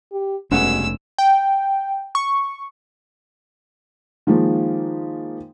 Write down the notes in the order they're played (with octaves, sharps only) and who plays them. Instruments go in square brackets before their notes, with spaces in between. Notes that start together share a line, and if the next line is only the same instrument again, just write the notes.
[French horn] G4
[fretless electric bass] F1 A3 C#4 [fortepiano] G2 G#3 F#5 [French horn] B2 [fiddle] E6
[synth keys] G5
C#6
[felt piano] D#3 F3 G#3 A#3